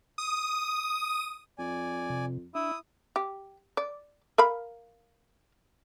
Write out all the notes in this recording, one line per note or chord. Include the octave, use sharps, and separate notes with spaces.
D#6
F2 D5 G#5
C3
D4 E4 E5 D#6
G4
D5
A#4 F5 B5